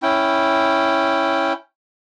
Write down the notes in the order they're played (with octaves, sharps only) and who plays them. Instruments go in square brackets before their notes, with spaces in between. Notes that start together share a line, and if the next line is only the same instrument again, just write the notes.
[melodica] C#4 E4 G5